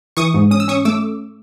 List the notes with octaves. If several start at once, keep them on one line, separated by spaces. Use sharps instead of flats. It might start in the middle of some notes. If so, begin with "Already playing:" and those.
E3 C#6 D#6
G#2
C#4 D#6
E6
C#4 C#6 D#6
A3 D6 E6